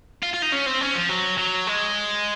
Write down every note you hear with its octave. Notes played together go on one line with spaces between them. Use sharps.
F4
F4
D#4
C#4
C4
C#4
F3
F#3
F#3
G#3